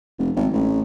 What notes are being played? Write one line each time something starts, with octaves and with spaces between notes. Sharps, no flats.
F1
G#1
A1